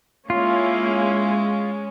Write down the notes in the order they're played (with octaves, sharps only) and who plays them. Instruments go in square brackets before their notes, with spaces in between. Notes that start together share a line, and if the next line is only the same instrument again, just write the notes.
[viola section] G#3 C#4 [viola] A#3 E4 [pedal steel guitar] F4